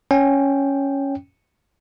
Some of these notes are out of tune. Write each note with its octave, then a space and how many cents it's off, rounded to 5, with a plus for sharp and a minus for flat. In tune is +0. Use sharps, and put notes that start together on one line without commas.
C#4 +0 G5 +0